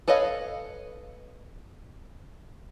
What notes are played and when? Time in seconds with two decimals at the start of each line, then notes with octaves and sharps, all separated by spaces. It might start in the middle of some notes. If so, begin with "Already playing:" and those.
0.08 A4 B4 C#5 D#5 F5